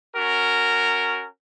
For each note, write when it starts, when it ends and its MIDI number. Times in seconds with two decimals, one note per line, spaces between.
0.16 1.25 61
0.16 1.25 66
0.16 1.25 70